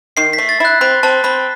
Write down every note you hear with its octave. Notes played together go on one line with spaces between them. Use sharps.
D#3 C7
B6
A3
A6
E4 F#6
C4 B5
C4 A5
C4 B5